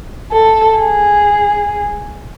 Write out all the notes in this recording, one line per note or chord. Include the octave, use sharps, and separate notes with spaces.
A4
G#4